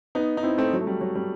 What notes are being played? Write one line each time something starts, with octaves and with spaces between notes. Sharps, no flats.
B3 D#4
D#4
C4 E4
A3 C4
F#3
A3
G3
F#3
G3